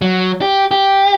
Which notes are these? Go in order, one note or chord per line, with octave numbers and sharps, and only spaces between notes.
F#3
G4
G4